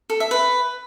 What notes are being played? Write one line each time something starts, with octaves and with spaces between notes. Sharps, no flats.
A4
E5
B4